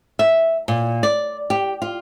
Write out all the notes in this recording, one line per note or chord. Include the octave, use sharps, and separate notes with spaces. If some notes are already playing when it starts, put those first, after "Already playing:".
E5
A#2
D5
G4
F4